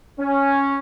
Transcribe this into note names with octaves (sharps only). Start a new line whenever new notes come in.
C#4